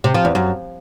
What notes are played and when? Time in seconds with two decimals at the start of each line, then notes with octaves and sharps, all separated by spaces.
0.04 C3
0.14 F3
0.25 E2
0.35 F#2